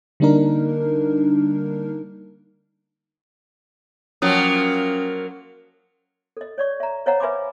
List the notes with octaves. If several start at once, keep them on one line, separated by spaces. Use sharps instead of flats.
D3 G3 A#3 D4 D#4 A#4
F3 F#3 A#3 C#4 D#6
A4 D#5
C#5 D5 C#6
E5 A#5
C5 C#5 D#5 F5 F#5 A#5
B4 E5 G#5 B5 C6 D6